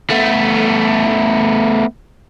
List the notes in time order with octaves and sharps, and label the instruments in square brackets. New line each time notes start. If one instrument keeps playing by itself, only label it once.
[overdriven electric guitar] A3 B3